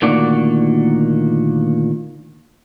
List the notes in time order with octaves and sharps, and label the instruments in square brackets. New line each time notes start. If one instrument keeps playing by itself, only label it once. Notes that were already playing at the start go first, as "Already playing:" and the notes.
[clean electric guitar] D2 A#2 D#3 A#3 F#4 D5